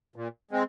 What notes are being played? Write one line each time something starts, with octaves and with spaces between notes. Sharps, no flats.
A#2
G#3 C4